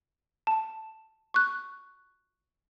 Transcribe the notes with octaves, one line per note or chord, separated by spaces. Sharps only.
A5
C#6 F#6